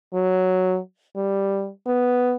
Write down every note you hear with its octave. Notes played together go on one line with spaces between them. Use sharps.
F#3
G3
B3